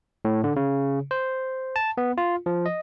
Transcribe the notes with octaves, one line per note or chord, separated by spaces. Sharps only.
A2
D3
C#3
C5
A5
B3
F4
F3
D#5